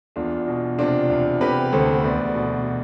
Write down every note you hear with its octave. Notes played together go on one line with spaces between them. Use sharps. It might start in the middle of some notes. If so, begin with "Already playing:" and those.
E2 D4 F4
B2
C3 D4 F4
E2
C3 G4 B4
D2 A4 C5
E2 B4 D5
B2